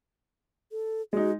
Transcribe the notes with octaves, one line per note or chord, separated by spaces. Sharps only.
A4
G#3 D#4 F#4